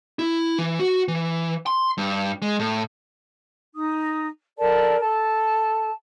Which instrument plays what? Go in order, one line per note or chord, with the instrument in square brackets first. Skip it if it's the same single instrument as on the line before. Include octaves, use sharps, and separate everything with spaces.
[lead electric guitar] E4
E3
F#4
E3
C6
G2
G#3
A2
[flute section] D#4 D#6
A4 A#4 D5 A5
A4 A5